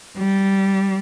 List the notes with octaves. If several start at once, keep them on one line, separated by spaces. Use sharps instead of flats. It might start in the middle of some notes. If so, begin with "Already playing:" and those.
G3